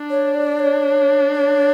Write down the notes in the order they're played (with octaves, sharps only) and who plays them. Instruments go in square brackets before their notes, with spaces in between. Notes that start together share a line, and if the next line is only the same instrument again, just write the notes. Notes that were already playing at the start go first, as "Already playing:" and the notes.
Already playing: [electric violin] D4
[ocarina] C#5
D5
C#5
C#5